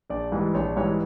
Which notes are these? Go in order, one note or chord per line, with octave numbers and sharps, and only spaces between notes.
A#1 D5
G#2 E3 G3
A#1 C#5
G#2 E3 G3 C#5